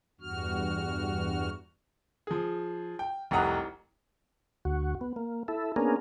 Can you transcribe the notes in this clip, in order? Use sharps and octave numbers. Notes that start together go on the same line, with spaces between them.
E2 G2 F#4 F6
F3 G#4
G5
F1 C2 G4 F#5 A#5 D#6
D2 F#4
B3
A#3
E4 A4
A#3 B3 C#4 D4 G#4 A#4